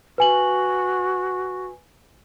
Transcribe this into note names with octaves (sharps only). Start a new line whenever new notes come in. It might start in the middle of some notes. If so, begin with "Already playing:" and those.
F#4 B4 G#5 F#7